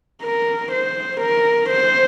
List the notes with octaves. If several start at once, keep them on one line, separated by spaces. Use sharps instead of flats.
A#4
C5
A#4
C5